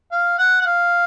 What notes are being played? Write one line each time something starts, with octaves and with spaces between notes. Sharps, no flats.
F5
F#5
F#5
F5